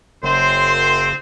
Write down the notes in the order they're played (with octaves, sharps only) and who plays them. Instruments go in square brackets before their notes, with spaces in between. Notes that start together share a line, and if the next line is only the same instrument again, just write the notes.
[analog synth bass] F#1 [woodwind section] F#2 C6 [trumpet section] C4 C5